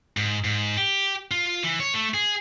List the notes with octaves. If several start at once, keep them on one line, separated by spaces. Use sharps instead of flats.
G#2
G#2
G4
F4
E3
C#5
A3
G#4